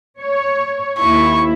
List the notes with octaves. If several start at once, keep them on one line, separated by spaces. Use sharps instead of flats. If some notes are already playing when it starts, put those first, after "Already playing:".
C#5
D#2 E4 C#6